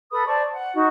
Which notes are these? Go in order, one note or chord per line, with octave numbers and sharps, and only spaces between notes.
A4 B4 B5 D#6
C5 D5 A5 C#6
F#5
D#4 F#4